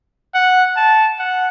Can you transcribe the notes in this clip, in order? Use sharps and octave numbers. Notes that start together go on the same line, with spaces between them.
F#5
A5
F#5